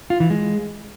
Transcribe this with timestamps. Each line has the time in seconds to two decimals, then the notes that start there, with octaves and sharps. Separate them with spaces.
0.10 F4
0.20 E3
0.30 G#3